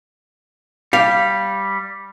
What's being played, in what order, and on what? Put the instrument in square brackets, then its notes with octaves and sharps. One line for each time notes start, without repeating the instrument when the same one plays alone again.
[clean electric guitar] G3 [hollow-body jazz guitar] F5